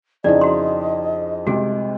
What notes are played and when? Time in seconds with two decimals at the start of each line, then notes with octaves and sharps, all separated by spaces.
0.24 F2 C#3 D#4 E4 G#4 D5 D#5
0.41 F#4 C6
1.47 C2 C3 G#3 F#4 G#4